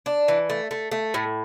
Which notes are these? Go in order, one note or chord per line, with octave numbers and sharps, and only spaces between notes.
D4
E3
A3
A3
A3
A2